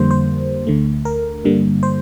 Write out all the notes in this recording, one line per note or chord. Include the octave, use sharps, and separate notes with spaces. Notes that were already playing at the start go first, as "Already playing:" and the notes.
Already playing: F2 D3 G3 A#3 C5
C5
D2 D3 A3
A#4
G2 D3 G3 A#3
C5